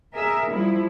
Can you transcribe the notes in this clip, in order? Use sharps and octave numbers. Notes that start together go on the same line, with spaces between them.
G#4 A#4 E5
F3 G3 E4